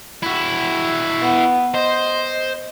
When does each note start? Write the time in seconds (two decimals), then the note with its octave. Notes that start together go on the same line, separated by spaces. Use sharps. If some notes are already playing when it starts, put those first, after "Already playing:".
0.23 E4 F#4
1.22 B3
1.75 C5 D#5